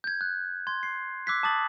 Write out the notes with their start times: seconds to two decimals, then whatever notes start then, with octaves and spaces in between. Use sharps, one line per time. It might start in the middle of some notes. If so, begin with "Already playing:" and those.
0.04 G6 G#6
0.21 F#6
0.67 C6 G#6
0.83 C7
1.26 D6 E6 F#6 G#6 B6 C7
1.43 A5 D6 D#6 A6 F#7